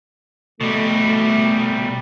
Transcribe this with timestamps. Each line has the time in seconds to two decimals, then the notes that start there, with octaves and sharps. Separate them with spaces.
0.61 B2 G3 A3